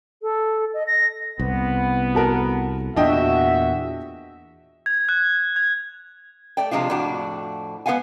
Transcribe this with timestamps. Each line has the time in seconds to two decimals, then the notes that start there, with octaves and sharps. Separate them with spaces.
0.22 A4
0.74 D#5
0.87 A#6
1.39 C2 B3
2.15 F#4 A4 A#4
2.96 E2 A#2 D4 F#4 D#5 E5 G5
4.86 G#6
5.09 F#6
5.56 G#6
6.57 A3 D5 G5
6.71 C3 F3 G#3 D4 F4
6.90 F2 A2 D4 F#4
7.86 G#3 B3 F4 F5 F#5 G#5